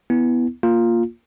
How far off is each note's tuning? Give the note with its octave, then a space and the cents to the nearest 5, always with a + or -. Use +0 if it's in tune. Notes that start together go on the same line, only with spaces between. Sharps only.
B3 +0 E4 +0
A#3 +0 F4 +0